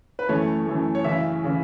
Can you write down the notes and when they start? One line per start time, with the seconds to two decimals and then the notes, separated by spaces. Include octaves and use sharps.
0.19 B4
0.29 F#2 E3 A3 C#5
0.67 F#2 E3 A3
0.95 C#5
1.04 F#2 C#3 E3 E5
1.44 C#3 E3